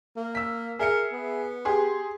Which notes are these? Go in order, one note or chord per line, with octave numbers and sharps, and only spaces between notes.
A#3
E6 B6
G#4 A#4 E5 C#7
B3
G4 G#4 C6